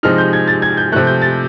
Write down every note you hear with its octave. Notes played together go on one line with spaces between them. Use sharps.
C3 F3 G#3 C4 D#4 F6
G6
G#6
A6
G#6
G6
C3 F3 A3 F#6
G6
A6